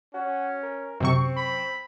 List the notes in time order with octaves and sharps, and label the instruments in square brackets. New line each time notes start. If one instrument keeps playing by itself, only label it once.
[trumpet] C#4 [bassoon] F#4
[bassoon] A#4
[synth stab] F#2 C3 C#6 [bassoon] C4
[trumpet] B5